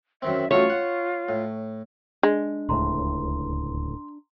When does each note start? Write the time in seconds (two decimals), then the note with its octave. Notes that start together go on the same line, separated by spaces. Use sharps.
0.22 F#2 D#3 C4 E5
0.51 F#2 F#3 A3 F4 C#5
0.70 F#5
1.29 A2
2.23 G#3 D4
2.69 D1 C#2 A2 A#5 C6